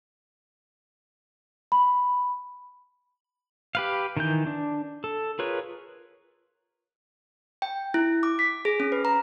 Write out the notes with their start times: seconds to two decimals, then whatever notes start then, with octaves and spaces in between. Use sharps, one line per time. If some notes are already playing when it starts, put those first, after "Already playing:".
1.72 B5
3.75 G4 B4 F5
4.17 D#3 E3 G6
4.47 D4
5.04 A4
5.39 F4 G#4 A#4 B4 C#5
7.62 G5
7.94 E4
8.23 D6
8.39 B6
8.65 G#4
8.80 C#4
8.92 B4
9.05 A#5